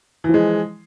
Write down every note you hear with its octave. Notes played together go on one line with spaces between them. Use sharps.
E3 F3 G#3